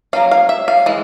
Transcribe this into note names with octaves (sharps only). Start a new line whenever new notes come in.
F#3 A#3 C#4 F5
F5
E5
F5
E3 G#3